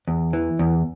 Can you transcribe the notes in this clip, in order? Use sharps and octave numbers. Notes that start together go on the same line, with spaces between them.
E2
E3
E2